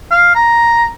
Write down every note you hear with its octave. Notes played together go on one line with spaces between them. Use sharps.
F5
A#5